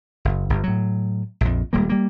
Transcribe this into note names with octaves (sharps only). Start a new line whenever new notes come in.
F#1
G1
A2 F#3
A#1 F2
D#1 G3 G#3 A#3
G3 A#3